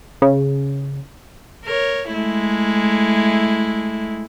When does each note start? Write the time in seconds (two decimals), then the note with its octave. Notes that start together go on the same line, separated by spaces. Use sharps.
0.22 C#3
1.65 A#4 C#5
2.13 G#3 A3 E4